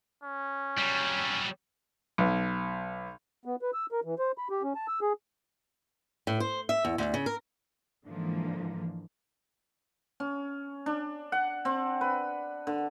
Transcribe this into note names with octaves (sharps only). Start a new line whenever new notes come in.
C#4
F#3 G3
B1
B3
B4
E6
A#4
E3
C5
B5
G4
C#4
A5
E6
G#4
A2
C5
E5
E2
D2
C#3
A#4
G#2 D3 E3 F3 A#3
C#4
D4
F#5
C4
B4
D3